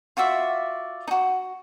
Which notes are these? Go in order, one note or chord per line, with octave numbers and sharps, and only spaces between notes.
F4 F#4 D5 E5
D#4 F#4